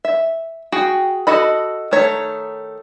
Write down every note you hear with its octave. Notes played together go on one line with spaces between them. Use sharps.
E5
F#4 G#4 G5
F#4 A4 D#5 B5
D#3 A3 C#5 A#5